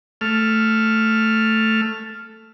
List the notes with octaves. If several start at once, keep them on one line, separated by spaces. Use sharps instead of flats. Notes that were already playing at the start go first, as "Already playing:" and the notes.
A3 F6